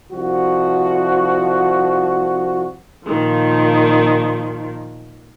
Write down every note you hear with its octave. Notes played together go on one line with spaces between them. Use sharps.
C2 F3 F#4
A#2 D#3 F3